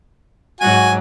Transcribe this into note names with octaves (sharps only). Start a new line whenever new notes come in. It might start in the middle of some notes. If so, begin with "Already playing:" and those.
G#2 F#3 F#4 G#5